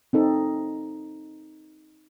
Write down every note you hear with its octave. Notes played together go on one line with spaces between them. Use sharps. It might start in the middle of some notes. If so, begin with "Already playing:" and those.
C4 D#4 A4